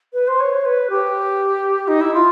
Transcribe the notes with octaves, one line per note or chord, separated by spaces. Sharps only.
B4
C5
C#5
B4
G4
D#4
E4
F4